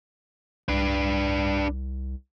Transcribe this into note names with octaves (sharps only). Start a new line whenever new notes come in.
C2 D4 B4